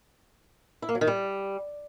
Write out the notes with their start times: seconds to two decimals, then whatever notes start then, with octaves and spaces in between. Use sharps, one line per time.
0.82 E4
0.89 A#3
0.95 F#3
1.01 D#3
1.07 G3